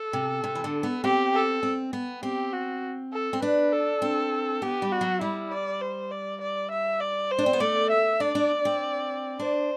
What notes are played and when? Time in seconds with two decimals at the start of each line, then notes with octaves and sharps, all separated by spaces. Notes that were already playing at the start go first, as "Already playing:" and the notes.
Already playing: A4
0.13 C3
0.44 C3
0.55 E3
0.64 D3
0.83 B3
1.04 C4 G4
1.34 A4
1.63 C4
1.93 B3
2.23 C4 G4
2.53 F#4
3.13 A4
3.33 C4
3.42 D4 B4
3.72 A4
4.02 C4
4.62 B3 G4
4.82 G3
4.92 F#4
5.01 F#3
5.21 G3 E4
5.51 D5
5.81 C5
6.11 D5
6.41 D5
6.71 E5
7.00 D5
7.31 C5
7.39 D4
7.46 C4
7.53 B3
7.60 A3 D5
7.90 E5
8.20 D4 D5
8.35 D4
8.65 C4
9.39 D4 C5